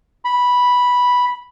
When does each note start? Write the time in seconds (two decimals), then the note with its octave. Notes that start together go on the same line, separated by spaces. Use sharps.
0.25 B5